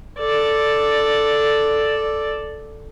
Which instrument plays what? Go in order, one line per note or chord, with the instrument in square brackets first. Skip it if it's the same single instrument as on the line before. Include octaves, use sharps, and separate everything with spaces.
[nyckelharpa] A4 D5